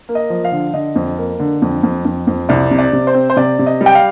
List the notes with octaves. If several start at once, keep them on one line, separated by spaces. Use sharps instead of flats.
A#3
D#5
F3
F5
D3
D3 D#5
F2
A#3
D3
F2
F2
F2
F2
C2 D5
C3
D5
C3
C5
C4
C5
C3 D5
C3
D#5
G3
G5
F5